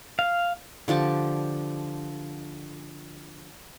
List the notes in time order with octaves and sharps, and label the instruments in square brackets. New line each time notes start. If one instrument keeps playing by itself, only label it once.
[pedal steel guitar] F5
[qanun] D3 F3 G4 A5